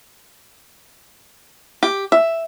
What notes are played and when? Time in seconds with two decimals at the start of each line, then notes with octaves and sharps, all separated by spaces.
1.83 G4
2.12 E5